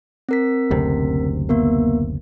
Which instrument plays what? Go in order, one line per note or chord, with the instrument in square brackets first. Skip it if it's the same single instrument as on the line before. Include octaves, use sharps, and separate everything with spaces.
[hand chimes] C4 A#4 B6
[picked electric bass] F#1 D2 C3
[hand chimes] A#3 B3 A#4